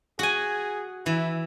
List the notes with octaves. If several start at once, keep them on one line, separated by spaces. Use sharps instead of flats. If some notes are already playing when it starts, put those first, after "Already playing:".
F#4 G#4 G#5
E3 E4